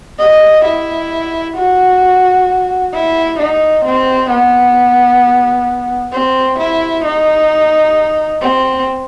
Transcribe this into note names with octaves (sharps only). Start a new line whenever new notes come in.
D#5
E4
F#4
E4
D#4
C4
B3
C4
E4
D#4
C4